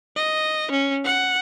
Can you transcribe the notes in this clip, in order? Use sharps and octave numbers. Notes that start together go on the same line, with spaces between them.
D#5
C#4
F#5